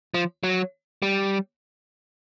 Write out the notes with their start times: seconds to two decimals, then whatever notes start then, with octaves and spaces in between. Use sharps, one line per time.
0.14 F3
0.43 F#3
1.02 G3